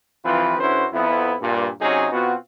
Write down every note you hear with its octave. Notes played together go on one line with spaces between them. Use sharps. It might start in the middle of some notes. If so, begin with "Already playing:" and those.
C2 E3 F3 C4 F4 B4
D3 C#4 E4 F#4 B4 C5
F2 B3 E4
G2 A#2
C3 F#3 C#4 D#4 G#4
B2 B3 C4 F4 F#4